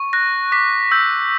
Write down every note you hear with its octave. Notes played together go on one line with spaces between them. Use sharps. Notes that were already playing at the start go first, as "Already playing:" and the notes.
Already playing: C#6
F#6 A#6
D6 B6
E6 G6